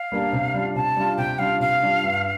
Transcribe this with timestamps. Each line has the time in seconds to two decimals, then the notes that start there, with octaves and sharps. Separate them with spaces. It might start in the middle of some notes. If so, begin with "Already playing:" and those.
Already playing: F5
0.12 G3 A#3 D4
0.32 C3
0.54 G3 D4 F4
0.75 C3 A5
0.97 G3 D4 F4
1.18 C3 G5
1.39 G3 D4 F4 F5
1.60 C3 F5
1.82 G3 D4 F4
2.04 G2